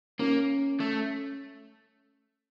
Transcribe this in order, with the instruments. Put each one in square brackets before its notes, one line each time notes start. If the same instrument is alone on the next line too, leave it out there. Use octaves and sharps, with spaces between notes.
[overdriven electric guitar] A#3 [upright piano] C#4
[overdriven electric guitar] A3